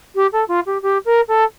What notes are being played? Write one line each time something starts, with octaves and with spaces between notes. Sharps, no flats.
G4
A4
F4
G4
G4
A#4
A4